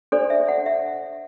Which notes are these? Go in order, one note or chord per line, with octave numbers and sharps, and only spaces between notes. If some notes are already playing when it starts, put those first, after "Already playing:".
D4 A4 C5 D5
E5
F#5
E5